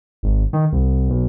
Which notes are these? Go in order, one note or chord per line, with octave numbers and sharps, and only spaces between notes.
G#1
D#3
C2
B1